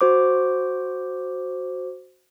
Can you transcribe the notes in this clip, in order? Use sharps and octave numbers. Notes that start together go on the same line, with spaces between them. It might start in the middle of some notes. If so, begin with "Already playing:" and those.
F#4 C5 D6